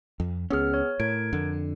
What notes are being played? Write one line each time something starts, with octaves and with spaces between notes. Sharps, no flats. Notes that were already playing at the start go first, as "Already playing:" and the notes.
F2
C#2 B3 C#4 G#4 F6
C#5
A2 A#4 G#6 D7
F2 D3